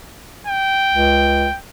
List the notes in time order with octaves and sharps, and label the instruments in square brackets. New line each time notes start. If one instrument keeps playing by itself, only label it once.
[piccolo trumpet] G5
[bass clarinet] C#2